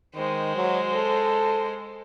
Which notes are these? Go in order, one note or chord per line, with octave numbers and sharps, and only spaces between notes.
D#3 G#3 C5
F#3
A4